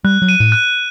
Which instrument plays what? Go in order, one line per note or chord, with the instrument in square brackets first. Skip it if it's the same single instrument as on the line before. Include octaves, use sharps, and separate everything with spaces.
[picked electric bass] G3 [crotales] F#6
[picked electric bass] F#3
[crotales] D#7
[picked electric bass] A2
[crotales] F#6